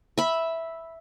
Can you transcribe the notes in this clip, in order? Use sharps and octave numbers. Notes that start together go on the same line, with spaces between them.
E5 B5